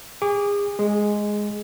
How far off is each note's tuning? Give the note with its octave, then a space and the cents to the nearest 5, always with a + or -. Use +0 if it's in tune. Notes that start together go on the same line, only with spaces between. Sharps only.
G#4 -35 D6 -25
G#3 +0 G#4 +10